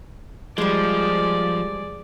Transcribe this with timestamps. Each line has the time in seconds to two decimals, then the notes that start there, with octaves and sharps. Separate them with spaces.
0.58 F3 G3 G#3 G#4 D5